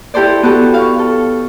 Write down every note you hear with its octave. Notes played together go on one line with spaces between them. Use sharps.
E4 G4 A4 C5 D5
B3 F#4 G4 A4
F5 C#6
A4